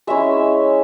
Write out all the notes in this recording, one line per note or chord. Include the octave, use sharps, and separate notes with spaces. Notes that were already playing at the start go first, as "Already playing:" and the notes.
G#3 C#4 E4 E5